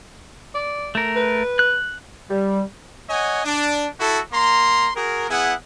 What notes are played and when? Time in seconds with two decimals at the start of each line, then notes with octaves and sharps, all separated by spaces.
0.55 D5
0.95 A3 A#4
1.16 B4
1.59 F#6
2.30 G3
3.08 C#5 D#5 F#5 G#5
3.44 D4
3.99 E4 F#4 A4
4.32 A#3 A#5 C6
4.95 F#4 G#4 A#4
5.29 B3 E4 G#4 F#5